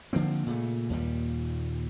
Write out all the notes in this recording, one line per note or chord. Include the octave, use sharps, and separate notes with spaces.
D3 F3 A#3 C4
A#2 C#3 A3
D#2 A#2 G3